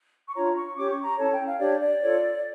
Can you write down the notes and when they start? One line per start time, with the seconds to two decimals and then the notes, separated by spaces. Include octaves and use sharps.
0.28 C#6
0.35 D4 F4 C#5 A#5
0.55 C#6
0.76 C#4 G4 C#5 D6
0.90 C#6
1.04 A#5
1.18 C#4 E4 A4 C#5 A5
1.33 G5
1.46 F5
1.59 D4 G4 C#5 D5
1.81 D5
2.02 F4 A4 C#5